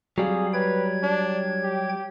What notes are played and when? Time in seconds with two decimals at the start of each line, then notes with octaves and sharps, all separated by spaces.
0.18 F#3 G3 C4 G#4 F5
0.53 B4 C#5 G5 G#6
1.03 D4
1.63 G4